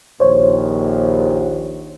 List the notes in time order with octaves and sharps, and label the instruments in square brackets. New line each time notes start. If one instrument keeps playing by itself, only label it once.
[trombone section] A#1 D#2 [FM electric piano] C5 C#5